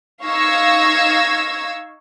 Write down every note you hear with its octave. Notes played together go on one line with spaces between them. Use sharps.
D#4 F5 C#6 E6 G#6 A#6